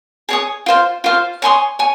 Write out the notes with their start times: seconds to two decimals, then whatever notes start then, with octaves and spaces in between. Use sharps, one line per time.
0.29 G#4 C#5 G#5 D#6
0.66 F4 C5 F5
1.04 F4 C5 F5
1.42 C#5 G#5 C6 D#6
1.79 C#5 G#5